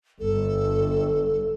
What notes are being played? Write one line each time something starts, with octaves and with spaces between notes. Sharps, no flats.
G1 A4